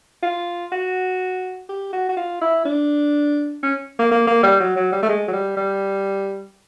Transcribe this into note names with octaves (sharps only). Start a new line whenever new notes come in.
F4
F#4
G4
F#4
F#4
F4
E4
D4
C#4
A#3
A#3
A#3
G3
F#3
F#3
G3
A3
G#3
F#3
G3
G3